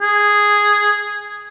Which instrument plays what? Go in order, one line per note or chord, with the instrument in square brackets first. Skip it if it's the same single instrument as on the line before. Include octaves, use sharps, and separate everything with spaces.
[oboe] G#4